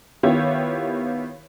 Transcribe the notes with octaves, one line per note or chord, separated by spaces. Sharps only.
D#3 B3 E4 F4 G4 C#5